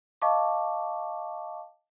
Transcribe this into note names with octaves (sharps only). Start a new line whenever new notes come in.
D#5 F5 A5 C#6 D6